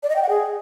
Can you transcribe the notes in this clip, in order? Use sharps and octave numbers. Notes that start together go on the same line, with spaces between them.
D5
D#5
G5
F#5
G#4